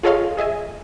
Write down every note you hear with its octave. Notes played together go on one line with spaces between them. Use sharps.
F4 G#4 A4 C#5 D#5 F5
G#4 D#5 E5 G#5